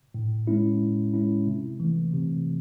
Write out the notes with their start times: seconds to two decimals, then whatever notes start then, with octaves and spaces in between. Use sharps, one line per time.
0.14 A2
0.47 G#3 C#4 E4
0.81 A2
1.14 G#3 C#4 E4
1.47 C3
1.80 E3 A3
2.13 C3